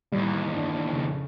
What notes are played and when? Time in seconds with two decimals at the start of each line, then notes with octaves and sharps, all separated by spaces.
0.12 D#2 A2 E3 G3
0.48 G2 D4
0.87 F2 C#3